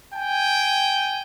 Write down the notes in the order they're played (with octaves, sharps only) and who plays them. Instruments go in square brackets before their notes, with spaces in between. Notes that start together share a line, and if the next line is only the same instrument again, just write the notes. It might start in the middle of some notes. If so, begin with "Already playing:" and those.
[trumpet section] G5 G#5